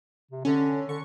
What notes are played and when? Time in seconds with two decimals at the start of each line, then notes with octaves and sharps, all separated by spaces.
0.31 C3
0.45 D3 C#4
0.89 D3 C#6